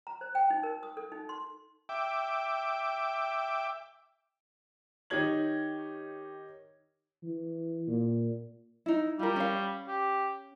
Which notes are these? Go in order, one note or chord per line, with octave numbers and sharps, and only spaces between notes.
A#5
C5
G5
D#4
A#4
D#6
A4
D#4
C6
E5 G5 D6
D#3 D#4 G4 C#5 G#6 F#7
E3
A#2
D#4 E4
G3 F4 A#4
C#4 F5
G4